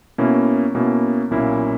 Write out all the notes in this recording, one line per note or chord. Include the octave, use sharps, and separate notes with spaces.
B2 A#3 C#4 E4
B2 A#3 C#4 E4
B1 A#2 A#3 C#4 E4